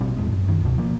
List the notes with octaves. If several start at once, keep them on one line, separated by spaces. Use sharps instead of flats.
A#1 B2 G3 C4
E2 A2 G#3
F#2
F#2 D#3
C#2 B2
F3 A#3